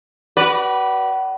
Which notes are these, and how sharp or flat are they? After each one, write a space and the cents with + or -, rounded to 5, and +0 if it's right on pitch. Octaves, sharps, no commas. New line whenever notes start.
F#4 +40 B4 -15 D5 +0